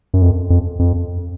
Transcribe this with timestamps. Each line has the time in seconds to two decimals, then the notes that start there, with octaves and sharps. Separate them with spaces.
0.14 F#2
0.22 F2
0.50 F2
0.79 F2